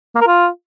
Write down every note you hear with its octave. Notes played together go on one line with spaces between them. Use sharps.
A#3
A#4
F4